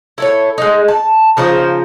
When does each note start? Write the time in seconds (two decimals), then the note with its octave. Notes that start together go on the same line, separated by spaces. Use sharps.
0.18 E4 A4 C#5
0.58 G#3 D#4
0.88 A5
1.37 C#3 F3 D#4 C5